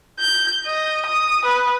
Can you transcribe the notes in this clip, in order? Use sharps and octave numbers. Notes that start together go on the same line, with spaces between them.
G6
D#5
D#6
B4